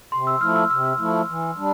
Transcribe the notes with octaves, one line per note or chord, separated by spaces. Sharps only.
C3 C6
E6
F3 A3 E4 F6
E6
C3 E6
F3 A3 E4
E3
G3 D4